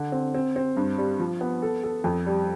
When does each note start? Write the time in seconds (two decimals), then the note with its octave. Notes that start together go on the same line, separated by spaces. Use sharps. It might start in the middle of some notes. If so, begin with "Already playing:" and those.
Already playing: D3
0.12 C4
0.34 C4
0.56 C4
0.77 G2
0.98 G3
1.20 F3
1.41 B3
1.62 A4
1.84 A4
2.04 F2
2.26 G3